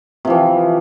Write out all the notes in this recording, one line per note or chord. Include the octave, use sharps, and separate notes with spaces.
C3 E3 F3